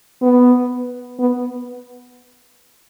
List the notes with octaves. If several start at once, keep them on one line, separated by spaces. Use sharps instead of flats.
B3
B3